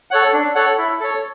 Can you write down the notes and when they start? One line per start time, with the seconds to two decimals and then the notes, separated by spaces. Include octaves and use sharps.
0.11 A4 C#5 F#5
0.33 D4
0.55 A4 C#5 F#5
0.78 E4
1.00 A4 C#5